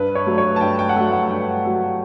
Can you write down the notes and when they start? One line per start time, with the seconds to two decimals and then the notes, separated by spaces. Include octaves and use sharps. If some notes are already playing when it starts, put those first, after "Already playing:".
Already playing: G2 B4
0.15 C#5
0.27 F#3 A3
0.38 C#5
0.56 A5
0.61 G2 G5
0.79 G5
0.89 F#5
0.96 F#3 A3 G5
1.12 F#5
1.30 G2 G5
1.65 F#3 A3